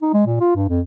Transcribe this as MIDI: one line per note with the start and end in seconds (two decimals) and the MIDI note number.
0.02 0.10 63
0.14 0.25 56
0.26 0.40 46
0.40 0.53 65
0.56 0.68 43
0.69 0.81 41